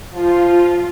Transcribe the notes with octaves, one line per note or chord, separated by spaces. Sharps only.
F3 F4